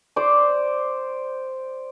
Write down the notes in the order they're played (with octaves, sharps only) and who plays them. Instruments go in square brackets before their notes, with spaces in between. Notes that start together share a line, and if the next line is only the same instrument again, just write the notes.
[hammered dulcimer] C5 D5